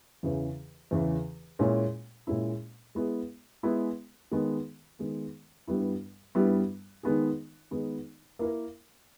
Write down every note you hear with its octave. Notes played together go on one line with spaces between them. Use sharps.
E2 C#3 E3
E2 C#3 E3
A#2 G#3 C#4 E4
A#2 G#3 C#4 E4
G#3 B3 E4 G#4
G#3 B3 E4 G#4
D#3 G#3 B3
D#3 G#3 B3
G2 G3 B3 E4
G2 G3 B3 E4
D#3 G#3 B3 D#4 G#4
D#3 G#3 B3 D#4 G#4
A#3 E4 A#4